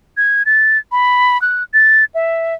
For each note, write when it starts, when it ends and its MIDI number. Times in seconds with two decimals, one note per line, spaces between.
0.17 0.43 92
0.46 0.78 93
0.92 1.40 83
1.42 1.63 90
1.74 2.05 93
2.15 2.55 76